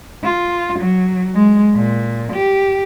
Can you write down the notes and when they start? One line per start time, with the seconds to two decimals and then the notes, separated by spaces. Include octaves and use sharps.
0.23 F4
0.80 F#3
1.35 G#3
1.76 A#2
2.33 G4